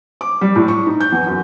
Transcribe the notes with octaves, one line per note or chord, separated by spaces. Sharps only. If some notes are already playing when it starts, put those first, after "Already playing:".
D6
G3
A2
C#6
D#4
G6
E2
F#2